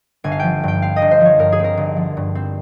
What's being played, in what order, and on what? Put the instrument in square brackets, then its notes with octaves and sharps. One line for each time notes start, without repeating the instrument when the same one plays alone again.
[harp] G1 G#5
F5
F3 G5
G2 G5
C4 F5
D#5
G1
C5
F3 C#5
G2 A#4
G#4
C4 A#4
G1
F3
G2
C4